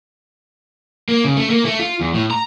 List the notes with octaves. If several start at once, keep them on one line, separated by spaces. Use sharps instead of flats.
A#3
C#3
A3
A#3
A3
F4
E2
A2
A#5